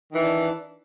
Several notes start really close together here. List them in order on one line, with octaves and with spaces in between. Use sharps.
D#3 E3 D4